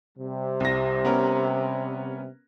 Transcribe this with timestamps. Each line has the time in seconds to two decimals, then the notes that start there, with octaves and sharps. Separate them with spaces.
0.18 C3 G3
0.60 C2 A#6
1.05 B3 C#4 A#4